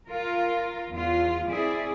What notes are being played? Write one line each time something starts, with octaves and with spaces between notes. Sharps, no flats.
F4 A#4
E2 F4
C4 E4 G#4 D5